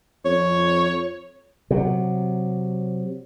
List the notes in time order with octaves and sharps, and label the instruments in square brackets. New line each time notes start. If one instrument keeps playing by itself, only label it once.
[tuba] F2 [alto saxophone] C#5
[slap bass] C3 F#3